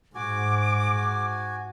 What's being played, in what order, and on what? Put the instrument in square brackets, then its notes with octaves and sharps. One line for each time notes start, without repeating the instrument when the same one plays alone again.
[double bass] G#2 [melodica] F#4 G#5 [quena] D6